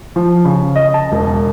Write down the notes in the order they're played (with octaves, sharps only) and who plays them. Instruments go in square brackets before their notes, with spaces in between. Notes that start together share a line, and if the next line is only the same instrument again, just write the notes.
[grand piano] F3
C#3
D#5
A5
E1